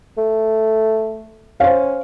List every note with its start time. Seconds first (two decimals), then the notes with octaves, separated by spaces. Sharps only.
0.18 A3
1.60 C#4 C5 F5